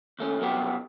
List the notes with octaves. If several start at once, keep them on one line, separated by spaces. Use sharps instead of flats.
D#2 A3 C#4
C2 F#2 B2 F#3 B3 G4